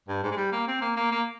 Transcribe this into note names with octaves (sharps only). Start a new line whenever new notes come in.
G2
G#2
G#3
G3
A#3
C4
A#3
A#3
A#3